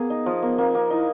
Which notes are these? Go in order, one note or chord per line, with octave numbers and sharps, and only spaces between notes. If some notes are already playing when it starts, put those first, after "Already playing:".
Already playing: A#3 B3 G#4
D#4
F3
A#3 B3
A#3 C4
A#3
D#4 E4